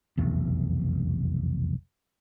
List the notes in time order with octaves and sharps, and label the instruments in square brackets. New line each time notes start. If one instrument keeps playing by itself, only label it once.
[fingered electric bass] F1 B1 E2